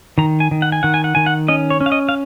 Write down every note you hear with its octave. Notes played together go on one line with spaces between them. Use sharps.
D#3 A#5
G#5
D#3
F#5
G#5
D#3 F#5
G#5
F#5
D#3 G#5
F#5
C#4 D#5
C#5
C#4
F5
D#5
F5